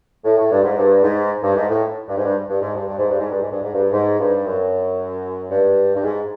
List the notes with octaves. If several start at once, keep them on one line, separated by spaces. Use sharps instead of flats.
A2
A2
G2
G#2
G2
G#2
G2
G#2
A2
G2
G#2
G2
G2
G#2
G2
G2
G#2
G2
G#2
G2
G#2
G2
G#2
G2
G#2
G2
F#2
G2
G2
G#2